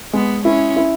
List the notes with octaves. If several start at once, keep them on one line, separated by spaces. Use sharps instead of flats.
G#3 B3
C#4 E4
E4